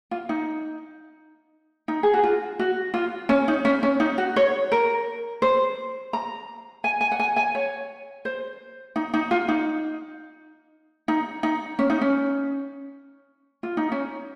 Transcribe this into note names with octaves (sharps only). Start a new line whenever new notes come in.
F4
D#4
D#4
G#4
F#4
F4
F#4
F4
C#4
D#4
C#4
C#4
D#4
F#4
C#5
A#4
C5
A#5
G#5
G#5
F#5
G#5
G#5
C#5
C5
D#4
D#4
F4
D#4
D#4
D#4
C#4
D#4
C#4
F4
D#4
C#4